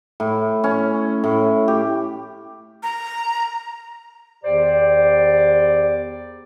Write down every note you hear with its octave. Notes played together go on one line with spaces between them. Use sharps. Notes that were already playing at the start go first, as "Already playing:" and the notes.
A2
C#4
A2
G4
A#5
E2 D#3 G4 C5 D5